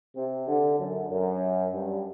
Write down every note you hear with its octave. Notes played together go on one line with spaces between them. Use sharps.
C3
D3
F#2
F#2
G2